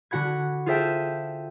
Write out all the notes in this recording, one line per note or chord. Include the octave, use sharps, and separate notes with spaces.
D3 F#4 F#5 B5 G#6
F4 G#4 A4 C5 E5 G5